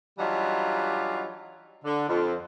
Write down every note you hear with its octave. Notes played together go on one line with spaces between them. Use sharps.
E3 F#3 G3 D4 D#4 F4
D3
F2